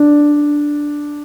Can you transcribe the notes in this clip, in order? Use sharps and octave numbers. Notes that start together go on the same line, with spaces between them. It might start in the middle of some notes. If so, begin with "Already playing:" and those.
Already playing: D4